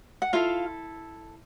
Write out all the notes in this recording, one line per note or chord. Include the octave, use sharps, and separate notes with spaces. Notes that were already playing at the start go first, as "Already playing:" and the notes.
F#5
E4 F4 A4 F5